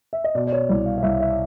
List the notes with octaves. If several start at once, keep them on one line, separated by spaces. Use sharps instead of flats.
E5
D#5
B2 D5
D5
C#5
C2 D5
F5
F5
C2 E5
E5